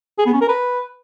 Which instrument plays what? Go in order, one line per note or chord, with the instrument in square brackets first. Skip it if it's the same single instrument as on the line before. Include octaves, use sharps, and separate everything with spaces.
[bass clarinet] G#4
B3
C#4
A#4
B4